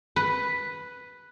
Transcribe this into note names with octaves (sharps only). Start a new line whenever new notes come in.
B4